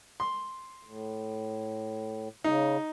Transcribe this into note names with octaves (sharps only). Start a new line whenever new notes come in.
C6
A2
C#3 D#4